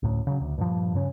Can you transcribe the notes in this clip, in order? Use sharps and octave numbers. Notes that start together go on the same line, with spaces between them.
D2 A2 C#4
C#3 F#3
D2
G2 A#2 F3
G2 C#3 C#4